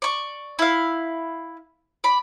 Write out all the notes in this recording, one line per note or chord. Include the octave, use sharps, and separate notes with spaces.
D5 C#6
E4 F5
D5 B5